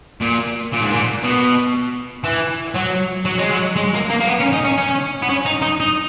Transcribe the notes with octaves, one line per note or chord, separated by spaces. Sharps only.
A#2
A#2
G#2
A#2
B2
E3
F#3
F#3
G#3
F#3
G#3
A#3
A#3
A#3
B3
C#4
D#4
C#4
C#4
B3
C#4
D#4
D#4
D#4